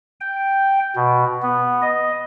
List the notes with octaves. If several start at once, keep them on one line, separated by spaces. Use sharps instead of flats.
G5
B2
B3
D#5